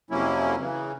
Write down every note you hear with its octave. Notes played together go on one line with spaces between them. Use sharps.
F2 C3 F#3 A#3 C#4 E4
C#3 E3